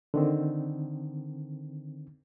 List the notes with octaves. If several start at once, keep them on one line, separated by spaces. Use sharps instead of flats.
D3 D#3 C4